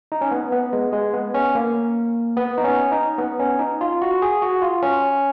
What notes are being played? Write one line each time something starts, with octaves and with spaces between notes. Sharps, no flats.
D#4
C#4
B3
B3
G#3
G#3
B3
C#4
A#3
B3
D#4
C#4
D#4
B3
C#4
D#4
F4
F#4
G#4
F#4
F4
C#4